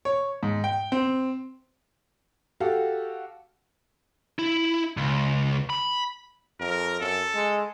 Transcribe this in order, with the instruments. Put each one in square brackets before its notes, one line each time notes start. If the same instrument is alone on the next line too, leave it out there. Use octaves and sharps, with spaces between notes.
[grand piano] C#5
G#2
G5
C4
[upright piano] F#4 G4 A4 F5
[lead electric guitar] E4
C#2
B5
[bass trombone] F2 [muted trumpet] A#4
[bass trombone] F#2 [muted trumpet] A4
[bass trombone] G#3